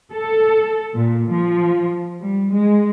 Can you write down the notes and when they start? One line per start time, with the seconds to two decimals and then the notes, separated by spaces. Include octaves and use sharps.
0.11 A4
0.96 A#2
1.32 F3
2.21 G3
2.53 G#3